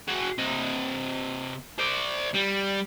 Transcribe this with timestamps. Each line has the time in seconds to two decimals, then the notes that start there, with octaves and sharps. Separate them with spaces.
0.08 F#4 G#4
0.38 C3 D#5
1.79 C5 D5
2.34 G3